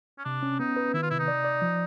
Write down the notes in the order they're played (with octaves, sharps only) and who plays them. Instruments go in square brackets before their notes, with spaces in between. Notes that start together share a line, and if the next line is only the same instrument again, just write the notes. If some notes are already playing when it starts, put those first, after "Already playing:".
[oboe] C#4
[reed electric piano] C3 [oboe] D4
[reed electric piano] C#4
[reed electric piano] B3 [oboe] D#4
[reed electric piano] B4
[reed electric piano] D#3 [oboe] E4
[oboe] F4
[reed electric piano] C3 [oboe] E4
[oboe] D#4
[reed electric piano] D5
D5
F3